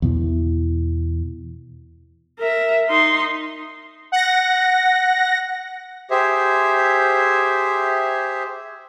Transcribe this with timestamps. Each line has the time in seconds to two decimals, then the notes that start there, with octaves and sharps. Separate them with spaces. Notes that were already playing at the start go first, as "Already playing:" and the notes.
0.02 E2 B2 E3
2.39 A#4 E5
2.89 D#4 C6
4.12 F#5 A#6
6.11 G4 G#4 C5 E5